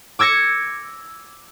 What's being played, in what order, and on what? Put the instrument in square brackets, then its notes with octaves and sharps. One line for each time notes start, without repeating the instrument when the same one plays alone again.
[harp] D6 E6 G#6 A#6 C#7